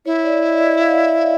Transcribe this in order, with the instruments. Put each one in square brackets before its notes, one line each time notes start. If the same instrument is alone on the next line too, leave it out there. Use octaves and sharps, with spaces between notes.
[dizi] E4 [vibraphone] C#5
[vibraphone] D5
D#5
D#5
F5
E5